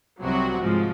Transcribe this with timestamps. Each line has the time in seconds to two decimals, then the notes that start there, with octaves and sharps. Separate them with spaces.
0.21 C2 C3 F#3 C4 F#4
0.62 G#2 F3 G#3